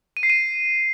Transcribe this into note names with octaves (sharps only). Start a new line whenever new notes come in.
D#7
C7
D#7